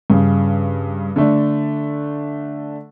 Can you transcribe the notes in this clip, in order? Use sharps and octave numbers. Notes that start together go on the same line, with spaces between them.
G2 C#3
D3 A3 D4